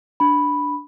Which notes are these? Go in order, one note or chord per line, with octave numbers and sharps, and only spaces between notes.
D4 B5